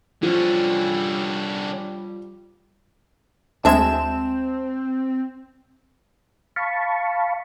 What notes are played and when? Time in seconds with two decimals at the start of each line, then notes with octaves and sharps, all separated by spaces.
0.23 D3 F3 G3 C#4
3.65 D2 G#3 C4 D4 E5 A5 E7
6.56 F5 A5 B5 C#6